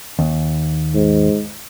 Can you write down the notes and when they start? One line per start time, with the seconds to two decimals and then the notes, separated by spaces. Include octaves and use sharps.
0.19 D#2
0.94 G#2